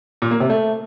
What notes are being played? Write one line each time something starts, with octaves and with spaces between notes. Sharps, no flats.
A#2
A#3
C3
A3